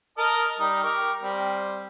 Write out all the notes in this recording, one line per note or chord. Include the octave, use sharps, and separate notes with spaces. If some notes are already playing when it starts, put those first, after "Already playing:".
A#4 D#5 A5
G3 D#4 D#6
G4 A#4 C#6
G3 C4